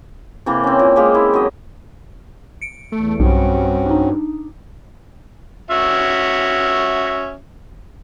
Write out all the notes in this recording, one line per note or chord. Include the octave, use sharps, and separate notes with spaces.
C3 E3 A#3
C4 C#4
A#2
G#3 A#3 G4 F5
E4
F#3 D#5
C#7 D7
E2 A3
B1 G2 C4 C#4 F#4
D4 D#4
C#4 F#4 E5